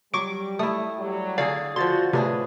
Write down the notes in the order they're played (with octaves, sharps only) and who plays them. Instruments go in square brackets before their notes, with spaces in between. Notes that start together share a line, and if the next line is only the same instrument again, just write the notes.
[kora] F#3 [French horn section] G3 [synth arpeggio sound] C#6 D6 D7
[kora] A3 E4 [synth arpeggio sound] D#6
[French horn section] F#3 G3
[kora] D3 F#4 G#4 [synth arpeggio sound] D5 F5
[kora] D3 F3 [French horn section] F#4 [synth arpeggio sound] C6 A6
[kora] A2 D4 G#4 [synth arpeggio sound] C3 [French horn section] B3 B4